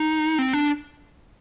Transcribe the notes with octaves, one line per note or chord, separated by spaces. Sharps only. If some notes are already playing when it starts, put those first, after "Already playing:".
Already playing: D#4
C4
D4